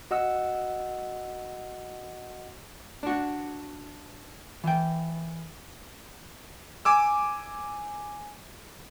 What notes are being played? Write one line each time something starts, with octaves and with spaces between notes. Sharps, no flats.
F#4 D#5 F#5 E6
D4 F#4
E3 G5
G#5 D6 E6